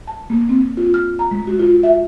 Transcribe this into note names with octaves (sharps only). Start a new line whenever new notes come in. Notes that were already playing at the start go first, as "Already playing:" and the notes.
A5
A#3
C4
F4
F6
A#5
G#3
F#4
F4
E5